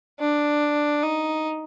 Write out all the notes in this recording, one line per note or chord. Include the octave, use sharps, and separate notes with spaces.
D4
D#4